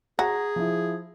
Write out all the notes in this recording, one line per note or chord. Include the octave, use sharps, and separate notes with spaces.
F#4 G#4 A#5
F3 E4